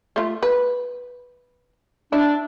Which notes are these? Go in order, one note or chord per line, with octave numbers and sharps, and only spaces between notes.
A3 F4
B4
D4 E4